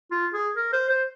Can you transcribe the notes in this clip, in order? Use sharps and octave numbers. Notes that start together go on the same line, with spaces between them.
F4
G#4
A#4
C5
C5